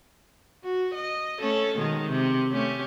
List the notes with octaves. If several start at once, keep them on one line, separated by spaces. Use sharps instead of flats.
F#4
D#5
A3 C#4 A4
B2 D#3 G#3
C3
A3 C#4 G4